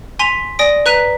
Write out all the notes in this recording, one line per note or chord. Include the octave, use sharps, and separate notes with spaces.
G#5 C6 B6 D#7 F7
D5 G#5 D#6 A#6 D7
B4 A#5 F#6 B6 D#7